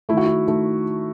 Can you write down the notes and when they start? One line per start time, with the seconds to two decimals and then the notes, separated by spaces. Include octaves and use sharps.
0.09 A3 E4
0.13 D#3 F#4
0.26 E4
0.47 D#3 A3